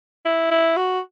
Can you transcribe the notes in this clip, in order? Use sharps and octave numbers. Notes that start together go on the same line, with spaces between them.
E4
E4
F#4